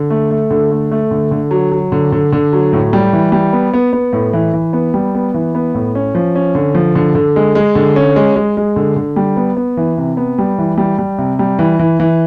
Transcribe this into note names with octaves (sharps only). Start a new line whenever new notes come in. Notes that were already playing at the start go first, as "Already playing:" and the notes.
Already playing: D3
A3
A3
D3
A3
A3
D3
D3
F#3
F#3
D3
D3
D3
F#3
A2
G3
E3
G3
B3
B3
B3
A2
E3
E3
B3
G3
B3
E3
B3
A2
C#4
F3
C#4
D3
F3
D3
D3
G#3
G#3
D3
C#4
G#3
G#3
G#3
D3
D3
G3
B3
B3
E3
C3
B3
G3
E3
G3
G3
C3
G3
E3
E3
E3